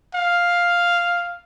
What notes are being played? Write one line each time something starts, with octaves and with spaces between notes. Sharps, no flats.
F5